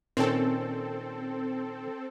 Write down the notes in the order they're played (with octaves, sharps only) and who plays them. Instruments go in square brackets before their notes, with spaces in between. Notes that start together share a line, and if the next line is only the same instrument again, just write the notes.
[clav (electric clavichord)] A#2 D#3 C#4 [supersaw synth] C4 A4